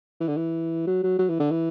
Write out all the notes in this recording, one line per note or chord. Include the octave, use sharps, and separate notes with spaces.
E3
D3
E3
F#3
F#3
F#3
E3
D3
E3